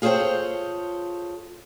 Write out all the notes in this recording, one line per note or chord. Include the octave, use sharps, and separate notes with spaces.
F4 G#4 A4 C5 C#5 G5